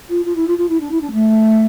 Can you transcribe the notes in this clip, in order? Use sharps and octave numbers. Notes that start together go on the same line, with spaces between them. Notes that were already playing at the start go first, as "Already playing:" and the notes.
F4
F4
E4
F4
F4
E4
D4
E4
D4
A3